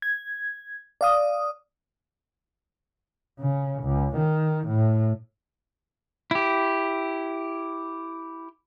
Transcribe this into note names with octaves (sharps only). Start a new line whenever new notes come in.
G#6
D5 F5 D#6
C#3
C#2
D#3
A2
E4 G4